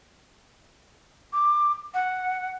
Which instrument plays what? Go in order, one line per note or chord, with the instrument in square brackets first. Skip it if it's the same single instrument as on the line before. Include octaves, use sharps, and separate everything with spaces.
[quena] D6
F#5